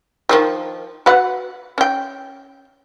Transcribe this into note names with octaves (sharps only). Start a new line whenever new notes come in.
D#3 F3 G3
F#4 B4 F#5
C#4 G5